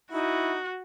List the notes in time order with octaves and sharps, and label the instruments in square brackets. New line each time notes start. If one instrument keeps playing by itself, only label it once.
[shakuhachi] D#4 [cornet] E4 [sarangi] F#4